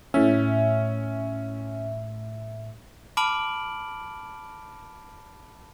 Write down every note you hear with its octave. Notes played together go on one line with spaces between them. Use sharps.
A2 C#4 E5
A5 B5 D6 F6 D7 F#7